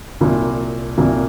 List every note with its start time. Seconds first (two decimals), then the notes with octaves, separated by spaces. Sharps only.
0.20 C2 A#2 F#3
0.97 C2 A#2 F#3